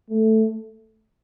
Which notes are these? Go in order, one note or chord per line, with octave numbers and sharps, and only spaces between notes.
A3